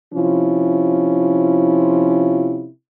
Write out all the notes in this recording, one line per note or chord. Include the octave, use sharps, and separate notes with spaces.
C3 F3 C#4 E4 F4